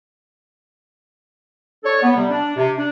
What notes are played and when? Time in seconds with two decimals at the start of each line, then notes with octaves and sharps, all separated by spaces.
1.84 D4 A4 C#5
2.03 B3
2.16 C3 G3
2.30 D4
2.57 C3
2.77 D4